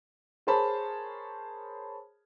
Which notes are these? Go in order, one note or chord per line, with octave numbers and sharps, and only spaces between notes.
G#4 A#4 C5 C#5 A5 B5